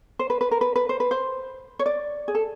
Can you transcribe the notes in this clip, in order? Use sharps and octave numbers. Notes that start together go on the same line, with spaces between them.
C5
B4
B4
A#4
B4
B4
C5
B4
C5
C#5
D5
G#4
A4